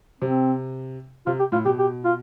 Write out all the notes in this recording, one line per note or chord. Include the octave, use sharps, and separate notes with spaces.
C3 C4
C3 F4
G4
A2 F4
B2 G4
G4
F4